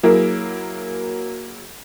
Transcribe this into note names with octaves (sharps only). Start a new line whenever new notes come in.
F#3 A#3 E4 G#4 A#4